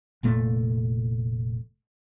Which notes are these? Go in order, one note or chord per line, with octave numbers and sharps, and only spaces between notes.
F1 A#2 A3